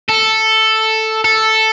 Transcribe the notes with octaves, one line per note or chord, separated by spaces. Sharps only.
A4
A4